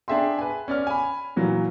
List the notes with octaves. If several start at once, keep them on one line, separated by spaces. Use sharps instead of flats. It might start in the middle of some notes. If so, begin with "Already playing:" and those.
D4 G#4 E5 G5 C6
B4 G#5
C#4 D5 F6
G#5 B5
A#2 E3 F#3